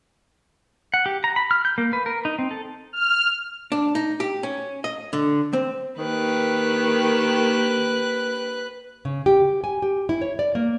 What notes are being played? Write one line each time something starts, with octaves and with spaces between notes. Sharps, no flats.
F#5
G4
A#5
B5
F6
G6
A#3
B4
A#4
D#4
C4
A4
F6
D4
D#4
G4
C#4
D#5
D3
C4
D#3 A#3 G4 B4 F#6
C#3
G4
G#5
G4
E4
C#5
D5
A#3